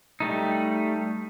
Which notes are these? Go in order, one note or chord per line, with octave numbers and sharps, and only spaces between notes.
G3 A3 D#4